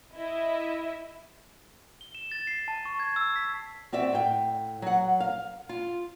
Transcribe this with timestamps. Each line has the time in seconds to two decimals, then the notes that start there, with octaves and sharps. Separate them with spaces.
0.16 E4 D#5 E5
2.01 G7
2.15 E7
2.32 A6
2.47 C7
2.68 A5
2.85 C#6
3.00 G#6
3.16 E6
3.36 B6
3.92 C4 F#4 D5 E5
4.13 A2 G5
4.82 F#3 F#5
5.20 F5
5.69 F4